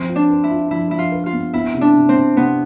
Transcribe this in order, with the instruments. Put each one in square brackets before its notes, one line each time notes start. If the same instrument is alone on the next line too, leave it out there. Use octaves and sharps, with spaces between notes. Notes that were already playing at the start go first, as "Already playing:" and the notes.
Already playing: [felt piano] F3 [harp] C4
[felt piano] F4
[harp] D4
[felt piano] B4
[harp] E4
[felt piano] F4
[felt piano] F3 [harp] E4
[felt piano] F3 [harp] E4
[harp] F4
[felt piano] B4
[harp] F4
[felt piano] B3
[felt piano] B3 [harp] E4
[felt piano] C3
[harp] D4
[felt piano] C3
[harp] C4
[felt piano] C3
[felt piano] C3 [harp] B3